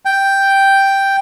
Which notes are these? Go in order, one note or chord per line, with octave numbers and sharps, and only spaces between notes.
G5